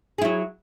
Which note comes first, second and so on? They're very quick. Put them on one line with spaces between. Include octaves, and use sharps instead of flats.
G#4 E4 F#3